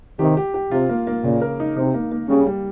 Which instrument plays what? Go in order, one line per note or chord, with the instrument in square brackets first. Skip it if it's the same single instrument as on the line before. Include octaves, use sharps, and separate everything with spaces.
[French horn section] C3 D#3 [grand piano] G4
[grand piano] G4
G4
[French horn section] C3 [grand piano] F4
[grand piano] A#3
A#3
[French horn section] A#2 [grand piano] C#3
[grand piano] A#4
D#4
[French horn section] C3 [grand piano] D#4
[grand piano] A#3
A#3
[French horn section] C#3 [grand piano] G3
[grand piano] G3